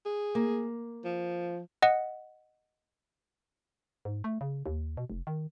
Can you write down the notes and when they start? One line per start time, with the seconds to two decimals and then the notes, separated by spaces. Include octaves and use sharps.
0.05 G#4
0.35 A#3
1.05 F3
1.82 D#5 F#5
4.05 G#2
4.24 A3
4.41 C#3
4.66 D#2
4.97 B2
5.10 F1
5.27 D#3